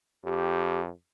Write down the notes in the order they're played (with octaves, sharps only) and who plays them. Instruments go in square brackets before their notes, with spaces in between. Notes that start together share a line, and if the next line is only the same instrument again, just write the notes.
[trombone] F2 [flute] G4